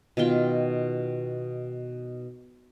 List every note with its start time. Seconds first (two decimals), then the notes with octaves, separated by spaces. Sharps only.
0.17 B2 D#3 F4 G5